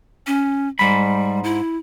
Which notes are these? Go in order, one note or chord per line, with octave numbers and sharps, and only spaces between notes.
C#4
G#2 G3 B5
E4